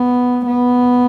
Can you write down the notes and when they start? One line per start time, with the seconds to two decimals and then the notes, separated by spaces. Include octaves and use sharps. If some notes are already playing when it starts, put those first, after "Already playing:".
Already playing: B3
0.46 B3